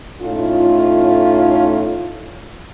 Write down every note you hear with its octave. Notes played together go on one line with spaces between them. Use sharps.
A2 A3 C#4 D#4 F4